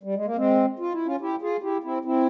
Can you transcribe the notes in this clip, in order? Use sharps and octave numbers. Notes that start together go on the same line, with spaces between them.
G3
G#3
A#3
G#3 C4
F4
E4
C#4 F4
E4 G4
F4 G#4
E4 G4
C4 E4
C4 E4